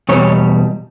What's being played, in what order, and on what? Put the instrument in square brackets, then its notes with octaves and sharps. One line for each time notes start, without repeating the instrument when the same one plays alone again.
[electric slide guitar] E2 B2 G3 C#5